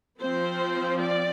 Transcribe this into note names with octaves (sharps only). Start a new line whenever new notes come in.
F3 C4 C5
D5